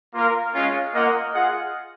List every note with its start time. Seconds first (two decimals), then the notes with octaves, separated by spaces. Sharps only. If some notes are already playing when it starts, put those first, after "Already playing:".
0.13 A#3 F4 A#4 F5
0.53 G#3 C#4 F4
0.93 A#3 F4 A#4 D#5 F#5
1.32 F4 G#4 D#5 F#5